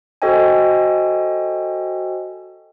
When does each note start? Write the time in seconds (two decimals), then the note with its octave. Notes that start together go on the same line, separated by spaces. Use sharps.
0.22 F#4 A4 C5 D#5 G5 G#5